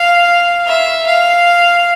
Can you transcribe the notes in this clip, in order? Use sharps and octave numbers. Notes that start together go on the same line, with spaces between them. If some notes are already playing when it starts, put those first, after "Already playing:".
Already playing: F5
E5
F5